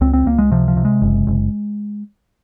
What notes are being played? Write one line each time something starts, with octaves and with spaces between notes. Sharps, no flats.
C#2 C4
C4
C#2 A#3
G#3
C3 F3
F3
C3
G#3
F#1
F#1